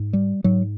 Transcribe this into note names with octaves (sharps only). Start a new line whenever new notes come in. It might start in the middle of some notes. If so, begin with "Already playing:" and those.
Already playing: G#2
G3
G#2 F#3